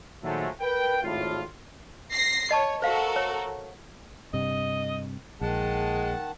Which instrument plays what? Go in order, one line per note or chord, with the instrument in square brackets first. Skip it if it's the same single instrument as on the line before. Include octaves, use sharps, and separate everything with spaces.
[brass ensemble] A#2 D#3 F3 F#3 G#3 A3
A#4 B4 G5
G#1 A2 F4
[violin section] A#6 C7
[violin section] C#5 [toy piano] D#5 A5 C#6
[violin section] F#4 A4 A#4 [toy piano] C5 F5 F#5
[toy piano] C#5
[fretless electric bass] G2 C3 [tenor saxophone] D#5
[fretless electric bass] A#1 [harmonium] D#3 F#5 A5 [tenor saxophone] G#3